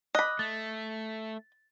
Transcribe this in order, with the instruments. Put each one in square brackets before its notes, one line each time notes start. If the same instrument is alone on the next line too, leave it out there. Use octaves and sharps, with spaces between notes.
[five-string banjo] D#5 B5 [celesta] D6 F#6
[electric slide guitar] A3 [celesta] A6